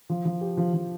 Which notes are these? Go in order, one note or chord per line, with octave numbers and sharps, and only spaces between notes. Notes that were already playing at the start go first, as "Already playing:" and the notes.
F3
F3
G4
F3
F3